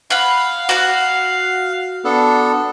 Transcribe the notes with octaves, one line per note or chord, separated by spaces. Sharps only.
F5 F#5 B5
F#4 F#5
B3 D4 A4